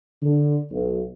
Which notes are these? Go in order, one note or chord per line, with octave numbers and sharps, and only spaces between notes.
D3
B1